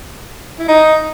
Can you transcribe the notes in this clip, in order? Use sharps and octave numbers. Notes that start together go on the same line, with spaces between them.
E4
D#4